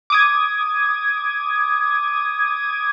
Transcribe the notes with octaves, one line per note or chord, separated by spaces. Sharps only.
D6 D#6 G#6